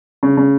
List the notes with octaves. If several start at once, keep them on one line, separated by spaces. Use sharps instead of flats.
C#3
C#3